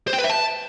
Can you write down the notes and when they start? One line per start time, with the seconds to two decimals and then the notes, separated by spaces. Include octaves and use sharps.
0.08 C5
0.13 G5
0.18 B4
0.24 E5
0.29 A5